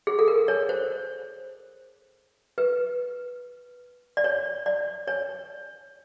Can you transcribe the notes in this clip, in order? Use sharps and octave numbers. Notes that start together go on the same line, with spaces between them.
G#4
A4
A#4
C#5
C5
B4
D5
C#5
D5
C#5